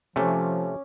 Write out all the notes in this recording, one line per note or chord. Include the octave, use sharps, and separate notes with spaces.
C3 F3 A3 C#4 D6